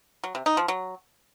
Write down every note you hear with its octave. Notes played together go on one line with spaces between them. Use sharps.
F#3
C3
D#4
F3
F#3